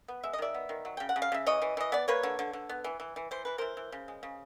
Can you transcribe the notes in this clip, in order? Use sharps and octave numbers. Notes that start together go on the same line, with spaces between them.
B3
G#3 E5
D#5
D#3 D5 E5
B3
D#3
F#3
C#3 G5
F#5
C#3
F5
C#3 E5
E3 C#5 D#5
E3
E3 D#5
B3 D5
A#3 B4 C#5
D3
D3
D3
B3
E3
E3
E3
E3 C5
E3 B4
E3 A#4 C5
E3
C#3
G#3
C#3